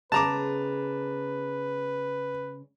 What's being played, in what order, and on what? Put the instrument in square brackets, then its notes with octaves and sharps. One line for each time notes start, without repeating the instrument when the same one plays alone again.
[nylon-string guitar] C#3 G#3 B3 [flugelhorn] B4 [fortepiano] A5 A#5 D6